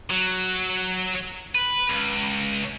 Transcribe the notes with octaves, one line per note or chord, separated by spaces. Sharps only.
F#3
B4
C#2